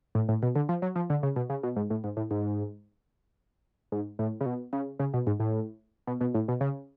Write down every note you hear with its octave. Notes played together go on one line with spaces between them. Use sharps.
A2
A2
B2
D3
F3
F#3
F3
D3
C#3
B2
C#3
B2
G#2
A2
G#2
A2
G#2
G#2
A2
C#3
B2
C#3
C#3
B2
G#2
A2
B2
B2
A2
B2
C#3